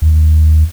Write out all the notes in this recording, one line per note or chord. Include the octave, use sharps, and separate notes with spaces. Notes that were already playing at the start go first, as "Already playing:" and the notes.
D#2